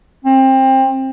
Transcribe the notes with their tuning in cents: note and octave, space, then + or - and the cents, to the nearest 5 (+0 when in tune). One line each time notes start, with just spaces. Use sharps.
C4 +25